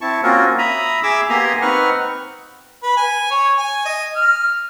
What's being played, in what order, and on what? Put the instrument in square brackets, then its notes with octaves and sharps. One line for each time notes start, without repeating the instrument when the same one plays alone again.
[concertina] C4 E4 A5 C#6
A#3 C4 C#4 F4 F#4 A#4
E5 A#5 B5 D#6
G#4 E5 D6 E6
A#3 B3 G4 G#5 A#5 C6
C4 D#4 B4 F#5 C#6 F6
[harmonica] B4
G#5
C#5
G#5
D#5
F6